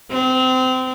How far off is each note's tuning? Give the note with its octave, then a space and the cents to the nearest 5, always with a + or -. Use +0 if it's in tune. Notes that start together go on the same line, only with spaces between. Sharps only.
C4 -25